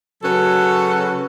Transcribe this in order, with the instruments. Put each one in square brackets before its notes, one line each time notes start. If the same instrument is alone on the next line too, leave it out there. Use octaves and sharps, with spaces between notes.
[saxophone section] C#3 F#3 C#4 F#4 A4 B4